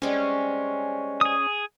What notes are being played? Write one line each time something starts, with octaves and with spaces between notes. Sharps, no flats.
G3 G#3 C4 C#4
G#4 D#6